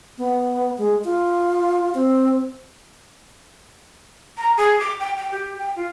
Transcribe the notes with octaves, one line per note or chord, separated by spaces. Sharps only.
B3
G#3
F4
C4
A#5
G#4
D6
G5
G5
G4
G5
F4